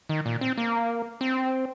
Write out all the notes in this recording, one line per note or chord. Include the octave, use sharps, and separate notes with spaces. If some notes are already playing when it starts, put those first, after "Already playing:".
D#3
A#2
C4
A#3
C4